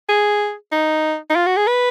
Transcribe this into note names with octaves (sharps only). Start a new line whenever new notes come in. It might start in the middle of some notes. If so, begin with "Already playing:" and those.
G#4
D#4
D#4
F4
F#4
G#4
B4